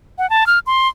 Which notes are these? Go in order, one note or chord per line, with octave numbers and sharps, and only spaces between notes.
F#5
A5
F6
C6